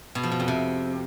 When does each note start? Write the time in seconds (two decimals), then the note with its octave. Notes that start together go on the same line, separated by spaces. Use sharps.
0.15 B2
0.23 F3
0.32 B2
0.40 F2
0.48 C3